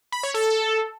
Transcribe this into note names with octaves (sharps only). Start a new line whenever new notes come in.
B5
C#5
A4